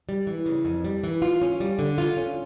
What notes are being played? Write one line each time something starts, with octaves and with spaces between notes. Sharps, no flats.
G3
E3
C#3
F2
G3
E3
F4
C#4
G3
D3
F4
C#4